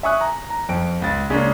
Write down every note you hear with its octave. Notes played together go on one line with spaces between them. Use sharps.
E5 G#5 C#6 D#6 F#6
A#5
A#5
F2 D7
C#2 A6
C#3 G#3 A#3 C#4 D4